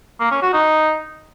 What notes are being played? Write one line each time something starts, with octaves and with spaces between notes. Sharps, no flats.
A#3
C#4
F#4
D#4